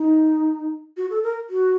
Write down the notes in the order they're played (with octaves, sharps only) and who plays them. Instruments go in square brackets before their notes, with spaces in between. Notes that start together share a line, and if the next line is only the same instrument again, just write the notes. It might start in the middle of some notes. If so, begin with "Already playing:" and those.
Already playing: [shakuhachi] D#4
F#4
A4
A#4
F#4